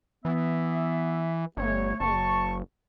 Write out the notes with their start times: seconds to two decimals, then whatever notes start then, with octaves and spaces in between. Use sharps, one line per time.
0.25 E3 B3 E5
1.57 G1 A3 C#5
2.00 F#1 A5 C#6